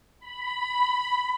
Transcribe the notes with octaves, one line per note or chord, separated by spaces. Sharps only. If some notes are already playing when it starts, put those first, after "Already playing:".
B5